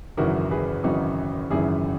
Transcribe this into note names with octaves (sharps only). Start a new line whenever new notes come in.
G#1 F#2 C#3 E3 F#4 A#4
G#4 B4
G#1 F#2 C#3 E3 D#4 F#4
G#1 F#2 C#3 E3 E4 G#4